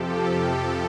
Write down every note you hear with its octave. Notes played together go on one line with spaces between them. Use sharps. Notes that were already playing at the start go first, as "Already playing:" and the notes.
Already playing: F2 C3 F3 G4 A4
G4 A4